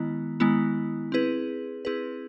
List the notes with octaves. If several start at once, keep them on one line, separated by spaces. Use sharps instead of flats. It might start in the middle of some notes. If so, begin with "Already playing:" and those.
Already playing: D#3 G#3 B3 E4
D#3 G#3 B3 E4
C4 E4 G#4 B4
C4 E4 G#4 B4